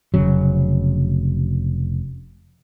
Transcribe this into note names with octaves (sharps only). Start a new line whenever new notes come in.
F1 C#3 F#3